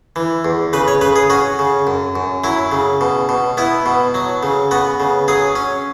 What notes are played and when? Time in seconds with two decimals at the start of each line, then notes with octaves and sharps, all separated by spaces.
0.16 E3
0.45 E2
0.73 C#3 B4
0.88 C#5
1.01 C#3 B4
1.16 G#4
1.30 C#4 F#4
1.59 C#3
1.87 F#2
2.16 F#2
2.44 F#3 E4
2.72 C#3
3.01 B2
3.29 B2
3.57 B3 E4
3.86 B2
4.14 F#3
4.43 C#3
4.71 B3 F#4
5.00 C#3
5.28 F#3 G#4
5.56 C#4